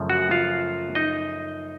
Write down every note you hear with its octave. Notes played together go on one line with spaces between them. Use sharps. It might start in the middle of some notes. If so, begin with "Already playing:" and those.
Already playing: F#2 C#3 F3 A3
F#4 F#5
F4 F5
D#4 D#5